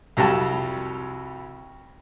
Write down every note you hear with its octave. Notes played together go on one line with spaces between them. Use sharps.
C2 F2 F#3 G3 A5